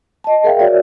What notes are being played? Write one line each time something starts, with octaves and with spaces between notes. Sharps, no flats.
D#5 A5
G#4 A#4 E5 F5 G5
F#4 A#4 C#5 D5 E5